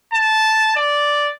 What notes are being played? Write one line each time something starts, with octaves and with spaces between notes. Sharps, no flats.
A5
D5